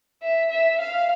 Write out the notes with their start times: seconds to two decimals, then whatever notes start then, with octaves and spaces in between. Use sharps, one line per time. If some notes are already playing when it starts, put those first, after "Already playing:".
0.23 E5
0.51 E5
0.80 F5